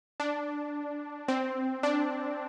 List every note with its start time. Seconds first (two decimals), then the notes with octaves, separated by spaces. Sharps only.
0.20 D4
1.28 C4
1.83 D4